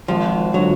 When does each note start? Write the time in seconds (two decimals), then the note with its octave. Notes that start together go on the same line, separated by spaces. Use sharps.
0.08 G#1 F3
0.54 D3 F3 F#3